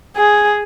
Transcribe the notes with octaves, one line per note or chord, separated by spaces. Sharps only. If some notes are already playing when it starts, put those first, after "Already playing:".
G#4